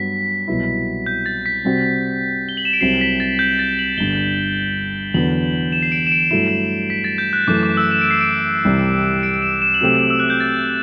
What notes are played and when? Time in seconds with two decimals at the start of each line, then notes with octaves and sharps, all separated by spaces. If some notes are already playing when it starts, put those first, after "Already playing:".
Already playing: G2 F#3 B3 B6
0.48 C2 B2 F#3 B3 E4
1.06 G6
1.26 A6
1.46 B6
1.64 C3 G3 C4 F#4
2.49 G7
2.57 F#7
2.65 E7
2.73 D7
2.81 C2 C3 F#3 C4 C7
3.01 B6
3.20 A6
3.39 G6
3.59 A6
3.79 F#7
3.97 G1 G2 D3 G7
5.14 E2 D3 F#3 B3 F#7
5.72 E7
5.82 C7
5.92 D7
6.07 E7
6.12 D7
6.31 G2 F#3 A3 E4 E7
6.90 B6
7.04 A6
7.18 G6
7.33 F#6
7.47 F#2 E3 A3 D6
7.63 D6
7.77 E6
7.91 E7
8.01 D7
8.11 C7
8.21 D7
8.64 C2 C3 E3 G3
9.23 D7
9.34 D7
9.42 E7
9.62 E7
9.74 F#7
9.81 C3 F#3 A3 C4 G4 E7
10.10 E6
10.19 F#6
10.30 G6
10.40 A6